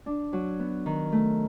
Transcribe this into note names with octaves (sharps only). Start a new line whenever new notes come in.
D4
F#3
B3
D#3
A3